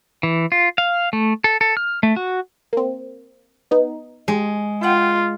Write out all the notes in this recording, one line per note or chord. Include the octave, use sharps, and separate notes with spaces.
E3
F4
F5
A3
A4
A4
F6
A3
F#4
A#3 C4
B3 D#4
G#3 G4
F4 F#5 G5 G6